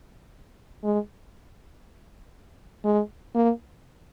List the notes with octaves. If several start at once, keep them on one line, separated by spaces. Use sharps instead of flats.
G#3
G#3
A#3